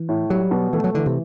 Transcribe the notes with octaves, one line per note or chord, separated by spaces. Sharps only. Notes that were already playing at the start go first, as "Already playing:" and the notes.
Already playing: E3
A2
F#3 G3
B2
E3 A3
F#3
D3 E3
C3